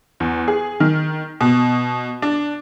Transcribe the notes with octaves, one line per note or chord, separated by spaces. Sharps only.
E2
G#4
D#3
B2
D4